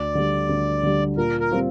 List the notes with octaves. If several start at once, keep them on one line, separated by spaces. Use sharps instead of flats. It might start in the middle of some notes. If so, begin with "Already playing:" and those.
Already playing: D2 D5
D3 G3
D2
D3 G3
A#2 A#4
A#4
G3 C4 F4